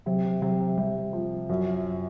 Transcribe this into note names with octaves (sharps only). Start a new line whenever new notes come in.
C3 F#3
C3 F#3
C3 G3
F3
F#2